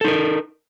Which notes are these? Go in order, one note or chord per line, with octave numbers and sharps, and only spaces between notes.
D#4 A4 A#4